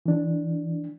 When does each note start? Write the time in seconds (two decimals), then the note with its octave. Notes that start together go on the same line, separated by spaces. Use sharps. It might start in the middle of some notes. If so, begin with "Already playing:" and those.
0.06 E3 D4